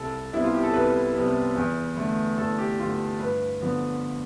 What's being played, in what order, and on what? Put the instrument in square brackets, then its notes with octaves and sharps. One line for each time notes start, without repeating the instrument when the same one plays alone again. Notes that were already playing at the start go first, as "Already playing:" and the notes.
Already playing: [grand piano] C2 A4
C3 G3 B3 E4
F4
G4
A4
C2 B4
C3 G3 B3
E2
D3 A3
E2 A4
G4
D3 A3 F4
G2 B4
D3 F3 B3